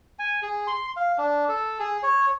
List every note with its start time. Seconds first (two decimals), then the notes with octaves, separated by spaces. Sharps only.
0.19 G#5
0.42 G#4
0.67 C6
0.97 F5
1.18 D4
1.49 A4
1.79 G#4
2.03 C#5